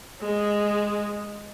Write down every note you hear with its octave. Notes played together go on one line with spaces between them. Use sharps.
G#3